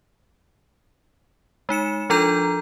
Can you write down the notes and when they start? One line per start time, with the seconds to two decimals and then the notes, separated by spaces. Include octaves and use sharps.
1.69 G#3 D#4 C#7 E7
2.10 F3 D4 F4 A4 A#5 G6